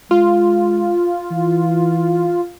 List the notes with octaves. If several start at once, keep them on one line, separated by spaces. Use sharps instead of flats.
G#3 F4
E3